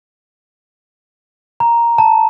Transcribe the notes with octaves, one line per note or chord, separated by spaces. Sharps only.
A#5
A5